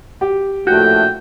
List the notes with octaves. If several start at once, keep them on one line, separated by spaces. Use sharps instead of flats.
G4
A#1 A2 A3 F#4 G5